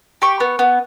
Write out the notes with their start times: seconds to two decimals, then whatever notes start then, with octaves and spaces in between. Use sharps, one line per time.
0.22 G4 C#6
0.40 B3
0.59 B3